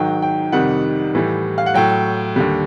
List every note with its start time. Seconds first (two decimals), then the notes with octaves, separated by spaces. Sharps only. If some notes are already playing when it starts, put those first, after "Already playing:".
Already playing: G#2 D#3 F#3 G5
0.22 G5
0.52 F2 C3 D#3 G3 F#5
1.15 A2 E3 G3
1.58 F5
1.66 F#5
1.74 A2 F#3 G5
2.36 D#2 D3 G3